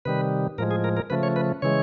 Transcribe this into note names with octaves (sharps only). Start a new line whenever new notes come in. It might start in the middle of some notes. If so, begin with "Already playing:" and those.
C3 D#3 G3 B4
A2 F3 G#3 A#4
G#4
A#4
A#4
C#3 F3 A3 B4
C#5
B4
C#3 E3 G#3 C#5